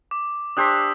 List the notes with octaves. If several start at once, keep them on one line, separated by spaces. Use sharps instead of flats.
D6
D4 G4 C5 D#6 E6 B6